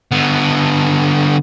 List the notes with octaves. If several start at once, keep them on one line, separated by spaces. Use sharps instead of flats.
D3 B3